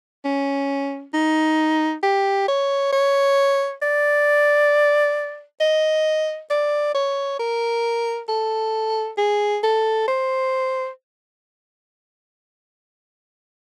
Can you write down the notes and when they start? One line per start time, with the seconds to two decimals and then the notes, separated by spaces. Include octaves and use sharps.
0.25 C#4
1.14 D#4
2.03 G4
2.48 C#5
2.92 C#5
3.82 D5
5.60 D#5
6.50 D5
6.94 C#5
7.39 A#4
8.29 A4
9.18 G#4
9.63 A4
10.08 C5